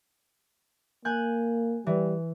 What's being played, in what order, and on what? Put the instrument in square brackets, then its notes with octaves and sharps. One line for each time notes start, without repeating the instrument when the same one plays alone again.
[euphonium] A#3 [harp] G#5 F#6 G6
[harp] E3 [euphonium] G3